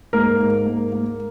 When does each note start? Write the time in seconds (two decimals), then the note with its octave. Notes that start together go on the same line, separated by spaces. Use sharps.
0.13 G#2 A#3 A#4
0.40 G#2
0.66 A#3
0.92 A#3